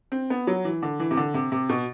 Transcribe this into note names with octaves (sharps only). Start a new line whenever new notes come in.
C4
B3
F#3
E3
D3
E3
C3
D3
C3
C3
B2